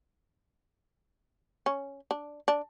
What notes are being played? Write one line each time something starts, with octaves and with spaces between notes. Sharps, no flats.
C#4
D4
D4